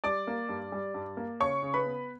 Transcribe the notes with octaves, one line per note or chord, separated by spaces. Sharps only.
G3 D5 D6
A#3
G2
G3
G2
A#3
C#3 C#5 C#6
C#3
B4 B5
B3